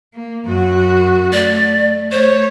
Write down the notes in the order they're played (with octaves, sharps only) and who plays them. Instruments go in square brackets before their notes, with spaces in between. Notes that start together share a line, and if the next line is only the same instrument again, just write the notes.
[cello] A#3
F#2 F#4
[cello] A3 [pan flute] D5
[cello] A3 C#5 [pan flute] C5